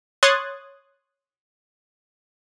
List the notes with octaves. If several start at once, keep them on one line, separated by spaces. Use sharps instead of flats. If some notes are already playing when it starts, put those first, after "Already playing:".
C#5 C6 D#6 F#6 G#6 A6